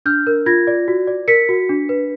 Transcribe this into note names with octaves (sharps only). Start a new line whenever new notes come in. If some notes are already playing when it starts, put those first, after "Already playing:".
D4 F6 G6
A#4
F4 G#6 A#6
D5
F#4
D5
A#4 B6 C#7
F#4
D4
B4